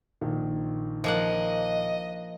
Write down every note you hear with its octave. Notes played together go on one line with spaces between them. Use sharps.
A#1 D#3
F3 A#3 D#5 F#5